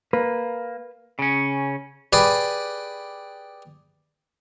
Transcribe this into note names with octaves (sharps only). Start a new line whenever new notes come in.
A#3 B4
C#3 C#4
G4 G#4 B4 D5